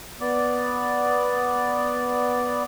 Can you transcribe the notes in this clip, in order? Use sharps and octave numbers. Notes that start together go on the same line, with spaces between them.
B3 D5